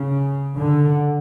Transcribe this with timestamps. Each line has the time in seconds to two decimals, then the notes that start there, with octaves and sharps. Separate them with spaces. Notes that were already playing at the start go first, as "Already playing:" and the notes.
Already playing: C#3
0.56 D3